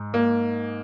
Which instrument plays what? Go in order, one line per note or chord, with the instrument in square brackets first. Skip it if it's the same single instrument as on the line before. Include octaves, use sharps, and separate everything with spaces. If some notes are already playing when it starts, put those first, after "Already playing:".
Already playing: [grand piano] G#2 G#3
[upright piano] A#3